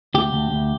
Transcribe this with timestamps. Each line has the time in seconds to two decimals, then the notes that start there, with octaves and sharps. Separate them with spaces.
0.14 D2 G4
0.33 D2
0.51 D2